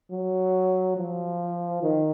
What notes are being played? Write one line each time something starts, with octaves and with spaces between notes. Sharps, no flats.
F#3
F3
D#3